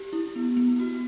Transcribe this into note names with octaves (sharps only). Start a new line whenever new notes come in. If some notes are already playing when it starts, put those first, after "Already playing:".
Already playing: G4
E4
B3
B3
F#4